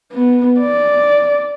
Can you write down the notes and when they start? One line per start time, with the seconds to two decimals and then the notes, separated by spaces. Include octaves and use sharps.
0.13 B3
0.60 D5